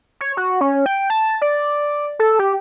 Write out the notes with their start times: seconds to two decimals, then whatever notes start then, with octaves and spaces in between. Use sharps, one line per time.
0.21 C#5
0.37 F#4
0.61 C#4
0.86 G5
1.10 A5
1.42 D5
2.19 A4
2.39 G4